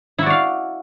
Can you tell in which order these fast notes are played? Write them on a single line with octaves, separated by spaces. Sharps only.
E4 F#4 D5 F5